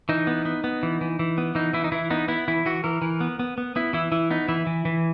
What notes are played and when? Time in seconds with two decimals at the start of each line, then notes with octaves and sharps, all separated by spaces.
0.09 E3 D#4
0.27 B3
0.45 B3
0.64 B3
0.83 E3
1.01 E3
1.19 E3
1.38 B3
1.55 E3 D#4
1.73 E3 E4
1.84 D#4
1.92 E3 E4
2.10 B3 D#4
2.28 B3 E4
2.48 E3 E4
2.66 E3 F#4
2.84 E3 A#4
3.02 E3
3.21 B3
3.39 B3
3.58 B3
3.76 B3 E4
3.93 E3 E4
4.12 E3 E4
4.31 B3 D#4
4.48 E3 E4
4.67 E3
4.85 E3